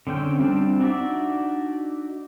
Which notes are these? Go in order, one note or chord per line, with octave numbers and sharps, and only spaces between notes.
D3 C4 C#4 G5
G3 C4 D4
D4 D#4 F#4 D5 E5